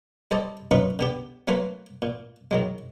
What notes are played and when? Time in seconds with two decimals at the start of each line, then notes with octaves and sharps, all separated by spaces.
0.31 G3 A4 C5 D5 D#5
0.71 F#2 C#4 D#4 F4 B4 C#6
0.99 D3 B3 G4
1.48 F#3 A3 A#3 B4 C5
2.02 A#2
2.51 D#3 F#3 G#3